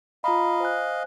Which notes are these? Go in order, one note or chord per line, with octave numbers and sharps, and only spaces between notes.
F4 D#5 F5 A#5 B5
C5 G#5 F#6